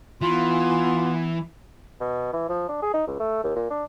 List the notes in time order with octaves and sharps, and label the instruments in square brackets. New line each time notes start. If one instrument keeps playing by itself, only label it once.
[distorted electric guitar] E3 [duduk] B3 [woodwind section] F4 [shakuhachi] C6
[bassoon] B2
E3
F3
D4
G#4
D#4
C#2
A3
D#2
A#2
D4